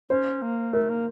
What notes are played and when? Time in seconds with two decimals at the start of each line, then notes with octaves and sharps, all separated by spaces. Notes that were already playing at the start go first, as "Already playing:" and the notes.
0.09 C#4 C5
0.42 A#3
0.73 A3 A#4
0.89 A#3